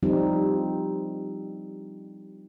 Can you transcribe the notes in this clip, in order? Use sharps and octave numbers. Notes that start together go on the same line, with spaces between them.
F3 G3 C4 D#4